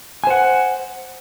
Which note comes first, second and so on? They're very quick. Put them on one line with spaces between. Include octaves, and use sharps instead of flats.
G#5 C5 F#5